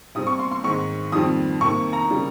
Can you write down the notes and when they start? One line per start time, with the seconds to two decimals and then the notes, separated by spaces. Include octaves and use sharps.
0.15 C3 G3 C4 D#6
0.27 C#6
0.39 C6
0.51 C6
0.64 G#2 D#3 G#3 C4 C#6
1.12 F2 D#3 G3 C4 D#6
1.61 C3 D#3 A#3 C#6
1.93 A#5
2.10 C#3 G3 A#3